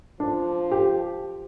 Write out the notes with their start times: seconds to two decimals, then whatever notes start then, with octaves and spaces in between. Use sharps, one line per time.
0.20 F3 D4
0.72 G4